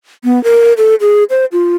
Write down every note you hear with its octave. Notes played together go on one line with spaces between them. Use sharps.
B3
A#4
A4
G#4
C5
F4